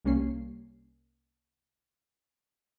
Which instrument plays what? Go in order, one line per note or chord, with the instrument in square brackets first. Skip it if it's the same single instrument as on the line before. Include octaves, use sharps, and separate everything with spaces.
[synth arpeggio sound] C2 G3 A#3 C#4 C7